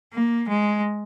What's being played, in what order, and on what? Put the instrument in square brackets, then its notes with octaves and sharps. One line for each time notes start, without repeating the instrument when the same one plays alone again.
[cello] A#3
G#3